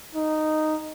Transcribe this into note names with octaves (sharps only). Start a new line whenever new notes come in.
D#4